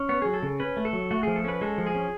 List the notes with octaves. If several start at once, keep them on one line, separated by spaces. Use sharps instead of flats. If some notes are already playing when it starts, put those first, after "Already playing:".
Already playing: C#4
B3 C#5
F#3 G#4
A4
C#3
C#4 B4
A3
A4
F#3
A3 F#4
F3 G#4
A4
C#4 B4
G#3 A4
F3
G#4
C#4